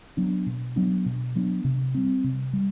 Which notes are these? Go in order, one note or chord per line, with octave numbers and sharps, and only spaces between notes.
F#3 B3 D4
B2
F#3 B3 D4
B2
F#3 B3 D4
C3
G3 C4
C3
G3